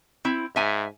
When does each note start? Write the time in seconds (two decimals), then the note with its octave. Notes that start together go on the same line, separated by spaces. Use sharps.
0.25 C4 E4
0.56 G#2 E5 G#5